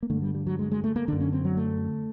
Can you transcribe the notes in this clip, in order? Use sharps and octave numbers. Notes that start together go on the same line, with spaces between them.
A#3
G2 D3 A3
G3
G3
F#3
G#3
G#3
A3
A#3
F#2 D3 D4
C#4
C4
F#3
A3